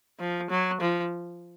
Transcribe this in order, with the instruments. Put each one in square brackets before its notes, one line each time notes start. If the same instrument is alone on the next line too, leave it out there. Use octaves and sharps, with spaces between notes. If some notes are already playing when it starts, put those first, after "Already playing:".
[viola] F3
F#3
F3